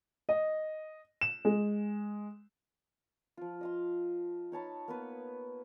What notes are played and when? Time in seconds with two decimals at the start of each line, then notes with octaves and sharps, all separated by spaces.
0.29 D#5
1.21 E7
1.45 G#3
3.37 F3 F4
3.61 D#5 F5 C6
4.52 D#4 C#5 A5 B5
4.88 A#3 B3 B4